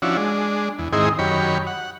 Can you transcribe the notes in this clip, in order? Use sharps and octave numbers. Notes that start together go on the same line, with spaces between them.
F3 C#4 D4 E4 F#4
G#3 D4
E2
G#2 D#3 C4 D#4 E4 G#4
F#2 D#3 G4 C#5 B5
F#5